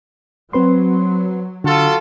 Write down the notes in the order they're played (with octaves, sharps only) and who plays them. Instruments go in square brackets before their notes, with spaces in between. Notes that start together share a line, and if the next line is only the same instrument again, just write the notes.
[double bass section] F#3 [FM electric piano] C4 B4 C6
[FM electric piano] D3 [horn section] F4 F#4 A4